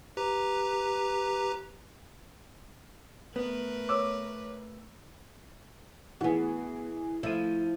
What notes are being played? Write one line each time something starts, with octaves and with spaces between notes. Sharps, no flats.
G4 B4 A#5
A3 B3 A#4 B4
C#5 D6 E6
E3 B3 F#4 G#4
F3 A3 E4 D#7